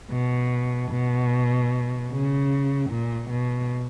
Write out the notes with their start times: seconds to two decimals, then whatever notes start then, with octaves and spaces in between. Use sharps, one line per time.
0.11 B2
0.91 B2
2.10 C#3
2.90 A#2
3.30 B2